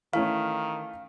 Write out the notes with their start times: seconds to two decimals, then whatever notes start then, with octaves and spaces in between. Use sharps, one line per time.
0.13 D#3 E3 A3 C#4 F5